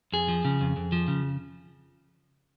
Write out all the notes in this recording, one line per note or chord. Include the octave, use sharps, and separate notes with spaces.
F2 G#4
F3
C#3
F2
F2
F3
C#3